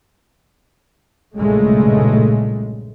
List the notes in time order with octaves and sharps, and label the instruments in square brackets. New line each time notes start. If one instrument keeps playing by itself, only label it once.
[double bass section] B1 G2 A#2 C#3 G#3 A3